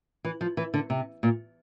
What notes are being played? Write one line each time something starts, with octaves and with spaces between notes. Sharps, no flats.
E3
F3
E3
D3
C3
A#2